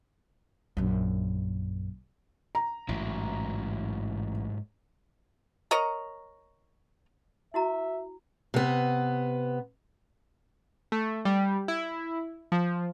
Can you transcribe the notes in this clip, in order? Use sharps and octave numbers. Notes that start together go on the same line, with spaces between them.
A#1 F#2
A#5
A1 G#2 F#3 E4
A#4 C#5 D#5 A#5
E4 F#4 E5 A#5
C3 B3
A3
G3
E4
F3